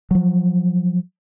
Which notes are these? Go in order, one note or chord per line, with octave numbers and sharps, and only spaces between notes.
F3 F#3